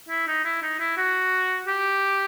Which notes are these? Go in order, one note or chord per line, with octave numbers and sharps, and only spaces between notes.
E4
D#4
E4
D#4
E4
F#4
G4